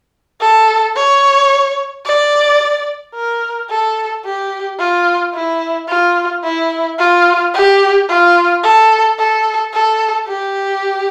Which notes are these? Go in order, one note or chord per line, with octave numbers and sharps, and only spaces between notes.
A4
C#5
D5
A#4
A4
G4
F4
E4
F4
E4
F4
G4
F4
A4
A4
A4
G4